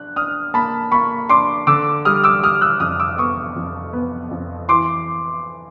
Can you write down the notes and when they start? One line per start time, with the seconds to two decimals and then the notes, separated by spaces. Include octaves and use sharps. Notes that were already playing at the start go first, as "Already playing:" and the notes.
Already playing: D4 F#6
0.16 D4 D#6 F6
0.54 A#3 A5 B5
0.91 A#3 B5 C#6
1.29 D4 C6 D6
1.67 D3 D6 E6
2.05 G3 D#6 F6
2.24 D6 E6
2.43 G3 D#6 F6
2.61 E6 F#6
2.80 F2 D#6 F6
3.00 D6 E6
3.18 B3 C#6 D#6
3.56 F2
3.93 B3
4.31 F2
4.69 E3 C6 D6